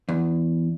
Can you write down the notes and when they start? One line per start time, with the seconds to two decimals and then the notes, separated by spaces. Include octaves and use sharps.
0.09 E2